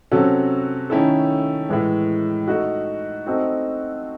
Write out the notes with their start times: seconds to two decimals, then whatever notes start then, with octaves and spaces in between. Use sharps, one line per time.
0.11 C3 F#3 C#4 F#4 A4
0.90 D#3 A3 C#4 E4 A4
1.69 A2 E3 G#3
2.48 A3 D#4 F#4
3.26 A3 C4 D#4 F#4 A4